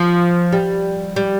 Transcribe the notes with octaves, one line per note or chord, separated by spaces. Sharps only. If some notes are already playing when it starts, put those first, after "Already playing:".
Already playing: F3
G3
G3